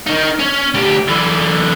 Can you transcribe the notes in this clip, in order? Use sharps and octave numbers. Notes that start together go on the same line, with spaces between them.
D#3 D#4
C#4
D2 G4
D3 E3